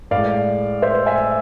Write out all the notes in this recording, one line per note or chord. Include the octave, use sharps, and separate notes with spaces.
A2 G#3 D5 F5
C5 E5
E5 G#5